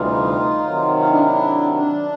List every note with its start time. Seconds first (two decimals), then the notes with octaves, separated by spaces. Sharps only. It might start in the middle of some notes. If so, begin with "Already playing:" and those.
Already playing: D2 C3 E3 G3 D#4 F4
0.63 C3 D#3 F#3
0.99 D#4 F4
1.11 D4 E4
1.23 D4 E4
1.72 D4